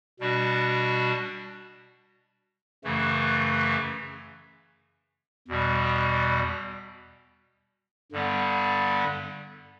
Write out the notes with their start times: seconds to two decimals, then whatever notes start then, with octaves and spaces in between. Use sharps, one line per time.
0.20 B2 G3 D4 F#4
2.84 F#2 C#3 E3 A3
5.48 E2 B2 G3
8.12 G2 D3 G3 B3